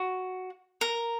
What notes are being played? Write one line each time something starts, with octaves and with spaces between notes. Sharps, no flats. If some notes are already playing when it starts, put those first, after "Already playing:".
Already playing: F#4
A#4